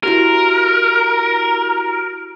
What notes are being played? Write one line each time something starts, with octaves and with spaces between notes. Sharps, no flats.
E4 F#4 G4 A#4